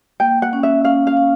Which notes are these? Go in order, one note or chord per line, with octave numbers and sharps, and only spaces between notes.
A#3 G5
F#5
C#4
E5
C#4 F5
F5
C#4